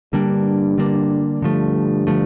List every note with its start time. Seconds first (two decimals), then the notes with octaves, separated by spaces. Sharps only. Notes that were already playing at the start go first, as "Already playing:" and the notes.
0.13 G2 D3 G3 A#3 D4
0.78 D3 G3 A#3 D4
1.42 G2 D3 F3 A3
2.07 D3 F3 A3